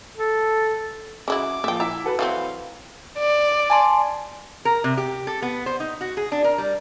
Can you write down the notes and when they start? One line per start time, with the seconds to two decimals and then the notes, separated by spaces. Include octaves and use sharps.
0.17 A4
1.28 C#3 F#3 E4 D6
1.64 A#2 F3 E5 G5
1.80 E4 E5 A#5
2.04 F#4 A4 B4
2.19 E3 F#3 C4 F5
3.19 D5
3.70 G#5 A5 C6
4.65 A#4
4.84 C3
4.97 G4
5.27 A4
5.42 B3
5.66 C5
5.80 D#4
6.01 F#4
6.17 G#4
6.32 D4
6.44 A#4
6.58 G3